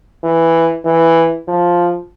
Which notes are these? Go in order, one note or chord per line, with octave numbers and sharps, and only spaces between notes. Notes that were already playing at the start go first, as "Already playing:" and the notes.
E3
E3
F3